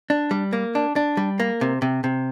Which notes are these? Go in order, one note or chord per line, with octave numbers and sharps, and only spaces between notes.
D4
G3
A#3
D4
D4
G3
A#3
C3
C3
C3